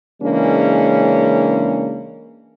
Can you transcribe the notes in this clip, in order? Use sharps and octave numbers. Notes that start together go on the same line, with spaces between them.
C#3 E3 G#3 A#3 C#4 D4